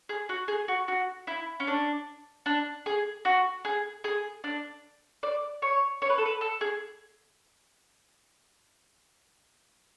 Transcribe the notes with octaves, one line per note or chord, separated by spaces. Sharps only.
G#4
F#4
G#4
F#4
F#4
E4
C#4
D4
D4
G#4
F#4
G#4
G#4
D4
D5
C#5
C#5
B4
A4
B4
A4
G#4